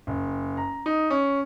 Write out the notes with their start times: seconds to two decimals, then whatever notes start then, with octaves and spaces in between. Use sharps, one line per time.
0.07 F#1
0.57 A#5
0.86 D#4
1.10 C#4